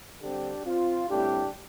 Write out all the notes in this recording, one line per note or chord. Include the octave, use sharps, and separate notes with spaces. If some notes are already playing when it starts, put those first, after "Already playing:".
D3 G3 C4 D4 G4
C4 F4
A2 G3 C4 D4 G4